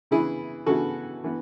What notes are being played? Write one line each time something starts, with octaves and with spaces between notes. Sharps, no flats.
C#3 E3 B3 E4 G#4
C#3 E3 B3 F#4 A4
E3 B3